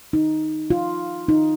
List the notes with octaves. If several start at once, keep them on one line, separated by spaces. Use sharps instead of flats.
D#4
F4
D#4